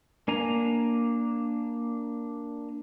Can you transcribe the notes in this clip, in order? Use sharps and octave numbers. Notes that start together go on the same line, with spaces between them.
A#3 D4 G#5 A#5